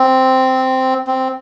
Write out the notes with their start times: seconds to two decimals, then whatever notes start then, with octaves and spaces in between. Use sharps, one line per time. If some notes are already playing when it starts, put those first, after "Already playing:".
Already playing: C4
1.07 C4